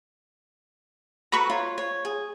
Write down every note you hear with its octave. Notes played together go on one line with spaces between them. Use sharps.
F#4 A4 B4 A#5 B5 C#6
F4 C#5
C#5
G#4